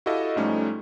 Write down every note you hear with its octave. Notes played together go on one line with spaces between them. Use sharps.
E4 F#4 G4 A4 D#5 F5
G#2 F3 G3 A3 C#4 D#4